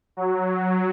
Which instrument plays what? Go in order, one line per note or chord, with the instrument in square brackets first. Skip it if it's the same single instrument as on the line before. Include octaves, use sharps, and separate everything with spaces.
[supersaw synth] F#3